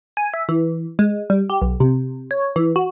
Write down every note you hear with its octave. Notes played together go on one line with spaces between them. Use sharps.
G#5
E5
E3
G#3
G3
G4
B1
C3
C#5
E3
F#4